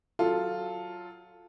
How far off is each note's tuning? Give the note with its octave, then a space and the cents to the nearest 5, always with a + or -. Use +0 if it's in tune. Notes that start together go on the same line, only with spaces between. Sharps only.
F#3 +0 F4 +0 A4 +0